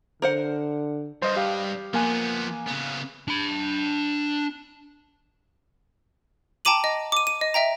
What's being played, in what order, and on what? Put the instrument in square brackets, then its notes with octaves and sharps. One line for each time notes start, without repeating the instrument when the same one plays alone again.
[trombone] D3 [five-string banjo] A#4 C5 F#5
[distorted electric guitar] G2 [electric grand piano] C5 D#5 D#6
[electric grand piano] G4 F5
[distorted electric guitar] F3 B3 [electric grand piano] A#3 G#5 F#6
[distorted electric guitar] C#3 B3
D4 B5
[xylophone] G5 A5 A#5 D6 D#7 F#7
D#5
D6 D#7
D#7
D#5
D#5 E5 G5 A#5